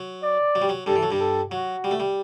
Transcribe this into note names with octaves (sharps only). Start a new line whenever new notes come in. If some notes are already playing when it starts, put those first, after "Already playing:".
Already playing: F#3
D5
F#3
G3
F#3
G2 G3 A4
E3
F#3
G2 G3
A4
F#3 F#4
G3
A3
G3